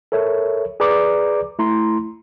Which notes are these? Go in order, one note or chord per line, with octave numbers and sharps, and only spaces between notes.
A4 A#4 C#5 E5
G#4 B4 D5 A#5 D6
A3 E4 A#5 C6